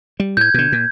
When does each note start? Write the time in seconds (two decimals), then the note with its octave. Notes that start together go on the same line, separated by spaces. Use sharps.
0.20 G3
0.37 A2 G6 G#6
0.54 B2 D3
0.72 A#2